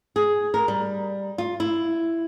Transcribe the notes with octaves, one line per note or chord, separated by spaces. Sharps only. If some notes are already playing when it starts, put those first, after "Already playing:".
G#4
A#4
G3
F4
E4